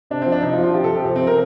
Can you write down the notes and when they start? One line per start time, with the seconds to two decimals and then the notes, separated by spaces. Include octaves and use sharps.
0.10 C3 D4
0.22 C4
0.26 F3
0.32 D4
0.42 C3 D#4
0.53 F4
0.58 F3
0.63 F4
0.74 C3 G4
0.84 A4
0.90 F3 G4
1.05 C3 C4
1.16 C4
1.22 F3
1.27 A#4